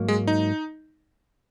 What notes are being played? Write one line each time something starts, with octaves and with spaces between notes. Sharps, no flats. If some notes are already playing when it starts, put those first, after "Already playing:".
Already playing: G#2 F#3 A#3
G#3
D#4